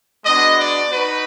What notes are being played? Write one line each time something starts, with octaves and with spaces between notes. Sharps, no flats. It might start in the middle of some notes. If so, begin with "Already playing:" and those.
G#3 B3 D4 F#4 D#5
D5
D#4 F#4 B4